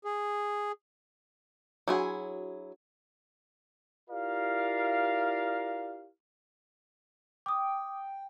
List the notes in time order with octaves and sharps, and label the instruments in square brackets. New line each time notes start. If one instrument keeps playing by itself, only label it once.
[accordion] G#4
[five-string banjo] F#3 E4 G#4 [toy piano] D4 F#4 F#5
[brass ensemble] E4 F4 G4 A#4 D5 F5
[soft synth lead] G5 [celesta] D6 D#6